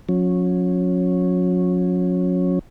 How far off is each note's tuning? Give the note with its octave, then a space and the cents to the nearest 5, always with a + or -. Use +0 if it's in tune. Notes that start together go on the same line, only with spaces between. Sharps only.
F#3 -40 C#4 -10